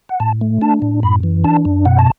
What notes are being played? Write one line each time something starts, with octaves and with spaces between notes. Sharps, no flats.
F#5
A2 A5
A3
D4 A5
A2
F#2 B5
E3
D4 A5
F#2
B2 F#5
A5